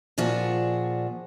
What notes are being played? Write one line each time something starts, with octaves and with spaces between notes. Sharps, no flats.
A#2 F3 D4 F#4 G#4